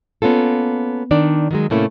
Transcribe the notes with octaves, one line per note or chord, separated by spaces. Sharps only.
A#3 B3 C#4 F4 A4
D#3 D4 D5
D#3 F#3 G#3
A2 C3 A3 A#3 C#4 E4